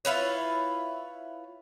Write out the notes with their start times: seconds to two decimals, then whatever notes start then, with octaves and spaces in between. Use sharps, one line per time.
0.05 E4 F4 B4 C#5